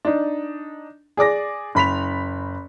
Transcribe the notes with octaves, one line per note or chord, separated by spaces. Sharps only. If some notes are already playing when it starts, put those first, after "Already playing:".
D4 D#4
G#4 D5 D6 A#6
F#1 B5 B6 F7